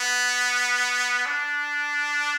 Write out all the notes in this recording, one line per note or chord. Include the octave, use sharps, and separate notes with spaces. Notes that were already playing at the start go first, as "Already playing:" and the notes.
Already playing: B3
D4